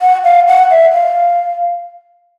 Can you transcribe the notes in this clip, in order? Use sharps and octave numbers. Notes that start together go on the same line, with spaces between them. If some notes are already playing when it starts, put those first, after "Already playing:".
F#5
F5
F#5
E5
F5